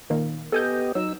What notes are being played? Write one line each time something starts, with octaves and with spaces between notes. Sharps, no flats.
A#2 D#3 A#3
B3 G4 A4 D#5 G#5 G6
F#3 D#4 E6